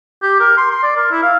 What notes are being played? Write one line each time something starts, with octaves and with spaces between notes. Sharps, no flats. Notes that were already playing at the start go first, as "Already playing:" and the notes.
G4
A#4
C6
C6
D5
A#4
E4
F5